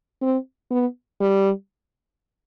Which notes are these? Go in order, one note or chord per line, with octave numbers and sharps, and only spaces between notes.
C4
B3
G3